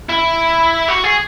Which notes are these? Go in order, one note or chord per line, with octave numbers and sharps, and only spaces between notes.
E4
F#4
G#4